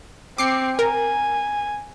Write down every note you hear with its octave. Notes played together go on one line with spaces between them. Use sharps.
C4 D6 C7 C#7
A#4 G#5